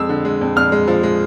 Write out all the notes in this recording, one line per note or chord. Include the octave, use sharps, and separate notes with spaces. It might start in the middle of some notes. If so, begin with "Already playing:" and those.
Already playing: F2 G#3 E6
D3
G#3
F2
F2 F6
G#3
F3
G#3